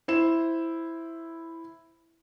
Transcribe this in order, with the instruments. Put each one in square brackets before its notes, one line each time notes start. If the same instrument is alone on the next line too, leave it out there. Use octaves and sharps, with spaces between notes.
[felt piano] E4 C5 E7